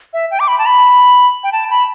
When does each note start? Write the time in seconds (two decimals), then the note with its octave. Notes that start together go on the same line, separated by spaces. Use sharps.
0.13 E5
0.31 G5
0.40 D6
0.48 B5
0.58 A5
0.66 B5
1.44 G5
1.52 A5
1.70 B5